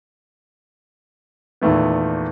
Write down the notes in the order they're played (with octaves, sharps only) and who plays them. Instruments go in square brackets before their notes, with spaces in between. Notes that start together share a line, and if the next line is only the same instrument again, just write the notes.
[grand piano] E2 A#2 D#3 A3 B3